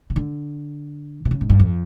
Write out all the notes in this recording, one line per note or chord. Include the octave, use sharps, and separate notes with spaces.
C#3
D3
C3
C#3
G#2
G2
F2